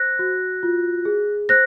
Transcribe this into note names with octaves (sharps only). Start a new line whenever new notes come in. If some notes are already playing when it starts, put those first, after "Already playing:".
Already playing: C5 F#6 A#6
F#4
F4
G#4
C5 F#6 A#6